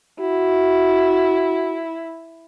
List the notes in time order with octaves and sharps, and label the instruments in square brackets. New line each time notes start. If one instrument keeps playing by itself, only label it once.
[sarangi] E4 [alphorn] F#4